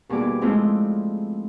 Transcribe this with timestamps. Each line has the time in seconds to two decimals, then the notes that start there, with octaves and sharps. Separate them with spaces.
0.09 D#2 B2 G3 G#4 D6
0.41 F3 G#3 A3 C4 E4 F4